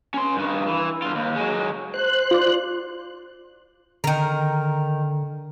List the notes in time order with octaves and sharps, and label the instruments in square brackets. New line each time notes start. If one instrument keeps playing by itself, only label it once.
[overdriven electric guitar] C#4 C6
G2 D#3
E3
G2 F4
D#2
F#3 G#3
[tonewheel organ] C5 F#6
[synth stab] F4 D5
[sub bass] D3 [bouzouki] D#3 A#4